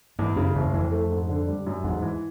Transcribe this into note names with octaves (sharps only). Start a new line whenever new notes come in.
E2 G#2
F#2 C#3
F#1 E2
F2 E3
A3
G#2
D3
G3
F#2
E2 G#2
E3